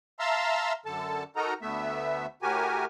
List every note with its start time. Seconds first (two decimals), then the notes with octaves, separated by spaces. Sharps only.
0.19 E5 F5 A5 A#5 C6 E6
0.86 F#2 D3 A4 A5
1.36 D#4 F#4 A4 A#4 D#5 A#5
1.62 D2 A3 B3 E5
2.42 A2 F#4 G4 A#4 G#5